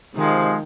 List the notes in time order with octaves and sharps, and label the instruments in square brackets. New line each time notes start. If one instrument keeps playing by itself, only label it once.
[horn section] C3 F3 G#3 [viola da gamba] D#3